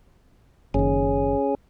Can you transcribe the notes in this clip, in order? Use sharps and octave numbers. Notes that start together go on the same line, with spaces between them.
F#1 D#3 C#4 G#4